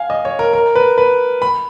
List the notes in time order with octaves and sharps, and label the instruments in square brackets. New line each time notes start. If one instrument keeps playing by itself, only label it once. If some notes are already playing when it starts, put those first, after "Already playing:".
Already playing: [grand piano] F5 G#5
D#5
C#5
A#4
A#4
B4
B4
B5